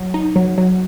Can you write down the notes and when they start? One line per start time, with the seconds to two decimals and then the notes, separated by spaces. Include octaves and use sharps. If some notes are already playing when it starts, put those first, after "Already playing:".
Already playing: F#3
0.14 D#4
0.36 F#3
0.58 F#3